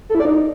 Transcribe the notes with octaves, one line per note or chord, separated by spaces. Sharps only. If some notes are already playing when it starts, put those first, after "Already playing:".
A4
E4
D5
D#4